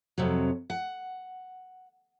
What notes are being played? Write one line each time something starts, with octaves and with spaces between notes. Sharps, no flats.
F2 C3 F#3
F#5